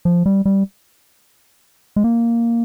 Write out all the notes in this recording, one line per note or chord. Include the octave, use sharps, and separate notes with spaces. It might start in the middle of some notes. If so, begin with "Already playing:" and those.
F3
G3
G3
G#3
A#3